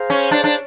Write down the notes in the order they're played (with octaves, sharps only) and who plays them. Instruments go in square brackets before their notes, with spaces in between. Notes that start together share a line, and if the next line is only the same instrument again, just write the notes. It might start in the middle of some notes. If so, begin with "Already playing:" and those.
Already playing: [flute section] G#4 C5 F5 A#5
[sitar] C#4
D4
D4